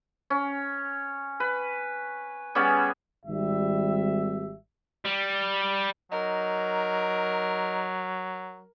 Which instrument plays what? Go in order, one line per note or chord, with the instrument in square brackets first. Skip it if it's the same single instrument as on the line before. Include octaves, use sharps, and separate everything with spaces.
[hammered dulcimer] C#4
B4
G3 B3 C#4 G#4
[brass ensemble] G#1 G3 E5
[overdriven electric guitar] G3
[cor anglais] F#3 [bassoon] D#4 [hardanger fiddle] A#4